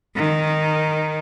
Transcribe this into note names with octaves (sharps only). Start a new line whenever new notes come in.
D#3